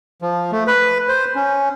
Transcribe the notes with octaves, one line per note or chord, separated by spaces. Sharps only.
F3
A3
B4
C5
C#4